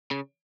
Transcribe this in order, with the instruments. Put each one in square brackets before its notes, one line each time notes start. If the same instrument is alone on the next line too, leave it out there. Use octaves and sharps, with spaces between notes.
[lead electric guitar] C#3